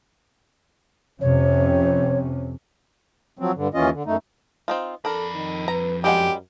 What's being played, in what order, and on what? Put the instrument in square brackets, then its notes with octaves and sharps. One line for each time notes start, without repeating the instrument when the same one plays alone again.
[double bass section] F2 C3 C#4 [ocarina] C#5
[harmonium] F3 F#3 C4
G2 D3
D#2 E3 C#4 F4 D#5
D3
F#2 A3 D#4
[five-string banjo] C4 D#4 F4
[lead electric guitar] F2 B5 [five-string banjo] D4 A#4 [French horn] A4
[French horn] D#3
[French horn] B4 [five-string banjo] A#5
[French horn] F#2 [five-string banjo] G3 G#3 F#5 [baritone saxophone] G4